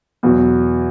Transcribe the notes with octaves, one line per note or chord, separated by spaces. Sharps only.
E2 B2 F#3